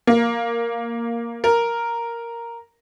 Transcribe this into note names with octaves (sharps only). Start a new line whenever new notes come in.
A#3
A#4